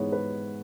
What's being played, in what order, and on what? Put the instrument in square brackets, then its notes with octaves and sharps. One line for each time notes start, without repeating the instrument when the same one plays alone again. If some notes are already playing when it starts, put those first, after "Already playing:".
Already playing: [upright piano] G#2 E3 G#3 B3 C#5
B4